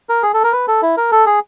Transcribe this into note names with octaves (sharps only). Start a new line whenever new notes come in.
A#4
G#4
A4
A#4
B4
A4
E4
A#4
A4
G#4